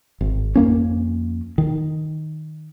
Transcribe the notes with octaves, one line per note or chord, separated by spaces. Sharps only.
G#1
F2 A#3 C#4
D#3